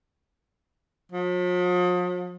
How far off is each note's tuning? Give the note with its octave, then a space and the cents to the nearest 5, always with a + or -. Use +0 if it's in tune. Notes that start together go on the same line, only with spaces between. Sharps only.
F3 +45